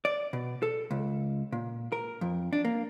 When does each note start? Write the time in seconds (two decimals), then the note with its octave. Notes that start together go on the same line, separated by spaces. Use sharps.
0.05 D5
0.33 B2
0.63 A4
0.91 C#2
1.52 A#2
1.92 A#4
2.21 F2
2.53 D4
2.65 A#3